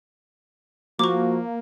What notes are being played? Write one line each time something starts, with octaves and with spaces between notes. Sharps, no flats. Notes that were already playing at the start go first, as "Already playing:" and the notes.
F3 A#3 F#4 C#6 D6